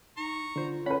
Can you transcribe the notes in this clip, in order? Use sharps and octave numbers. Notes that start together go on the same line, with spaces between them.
D#4 A#5 C#6
D3 F4 C5
C#4 B4 F#5 B5